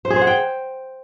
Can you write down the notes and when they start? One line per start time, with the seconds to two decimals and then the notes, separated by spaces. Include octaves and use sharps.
0.05 C5
0.10 G#4
0.16 C5
0.21 F#5
0.27 G5